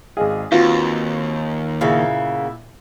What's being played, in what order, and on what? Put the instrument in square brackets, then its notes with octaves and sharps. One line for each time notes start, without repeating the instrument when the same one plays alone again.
[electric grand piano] G#1 D#5 F5 [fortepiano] G#4
[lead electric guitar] D#2 [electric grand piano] C4 F#4 B4 [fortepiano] F4
[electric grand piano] A#2 E4 E5 [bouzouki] C#3 A#3 B3